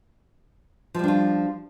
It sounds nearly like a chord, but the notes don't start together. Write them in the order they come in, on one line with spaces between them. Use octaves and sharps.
F3 G3 D4 F4